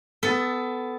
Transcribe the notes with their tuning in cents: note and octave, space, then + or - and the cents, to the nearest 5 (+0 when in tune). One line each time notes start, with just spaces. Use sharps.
B3 +20 A4 +0